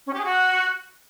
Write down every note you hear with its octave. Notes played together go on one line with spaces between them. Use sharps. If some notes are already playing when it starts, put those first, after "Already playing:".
C#4
G4
G#4
F#4